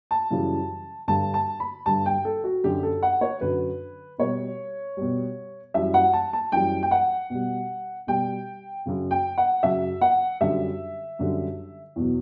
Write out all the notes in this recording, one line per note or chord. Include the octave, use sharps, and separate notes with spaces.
A5
F#2 C#3 E3 G3
G2 D3 G3 A5
A5
B5
G2 D3 G3 A5
G5
A4
F#4
F#2 D3 F#3 G4
A4
F#5
C#5
F#2 D3 F#3 B4
B2 G3 C#5
B2 G3
F#2 E3 G3 E5
F#5
A5
A5
F#2 E3 G3 G5
G5
F#5
B2 G3
B2 G3 G5
F#2 C#3 F#3
G5
F#5
F#2 C#3 F#3 E5
F#5
F#2 D3 G3 E5
F#2 D3 G3
E2 B2 F#3